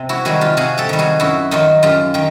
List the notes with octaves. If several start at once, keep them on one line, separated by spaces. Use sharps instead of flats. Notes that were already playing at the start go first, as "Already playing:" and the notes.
Already playing: C3
E4 F#4
D#3 G3 F#4 G#4
F4 G4
C3 F#4 G#4
G4 A4
D#3 G3
F#4 G#4
F#2 E4 F#4
D#3 F#3 D#4 F4
F#2 F4 G4
D#3 G4